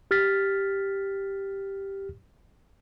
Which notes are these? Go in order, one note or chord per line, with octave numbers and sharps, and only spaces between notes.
G4 F6 A6 B6